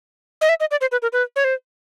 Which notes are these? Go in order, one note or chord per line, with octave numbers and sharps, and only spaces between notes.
D#5
E5
D#5
D5
C5
B4
A#4
B4
C#5
C5